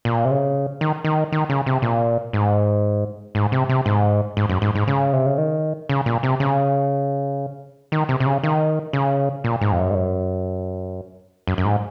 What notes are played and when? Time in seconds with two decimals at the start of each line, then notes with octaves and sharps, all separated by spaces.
0.05 A#2
0.25 C3
0.31 C#3
0.81 D#3
1.04 D#3
1.32 D#3
1.50 C#3
1.66 C3
1.82 A#2
2.33 G#2
3.35 G#2
3.52 C3
3.69 C3
3.86 G#2
4.37 G#2
4.49 F#2
4.62 G#2
4.75 G#2
4.87 C#3
5.13 C3
5.26 C#3
5.38 D#3
5.89 C#3
6.06 A#2
6.23 C3
6.40 C#3
7.92 D#3
8.09 C3
8.20 C3
8.26 C#3
8.44 D#3
8.93 C#3
9.44 A#2
9.61 G#2
9.72 F2
9.79 F#2
9.91 G#2
9.95 F#2
11.47 F#2
11.58 F#2
11.65 G#2